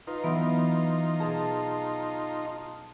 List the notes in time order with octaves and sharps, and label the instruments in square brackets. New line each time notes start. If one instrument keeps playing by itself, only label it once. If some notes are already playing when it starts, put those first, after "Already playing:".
[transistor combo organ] D#4 F4 [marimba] B4
[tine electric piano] E3 E5 [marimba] F#3 B3
[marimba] B2 G#4 [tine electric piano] A5